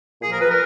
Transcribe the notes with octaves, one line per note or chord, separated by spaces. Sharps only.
A#2 F3 G#4
A#4
B4
A#4